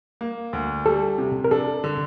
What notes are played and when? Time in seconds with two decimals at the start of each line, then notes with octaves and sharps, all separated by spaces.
0.21 A#3
0.53 D2
0.86 G3 A4
1.18 C3
1.44 A#4
1.51 D4 A4
1.84 D3